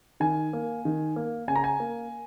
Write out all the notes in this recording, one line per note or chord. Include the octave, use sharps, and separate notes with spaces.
D#3 G#5
A#3
D#3
A#3
C#3 G#5
A#5
G#5
A#3